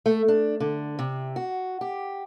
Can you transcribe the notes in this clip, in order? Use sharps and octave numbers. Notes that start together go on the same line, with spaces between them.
A3
D4
D3
C3
F#4
G4